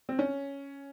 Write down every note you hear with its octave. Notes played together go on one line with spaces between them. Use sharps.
C4
C#4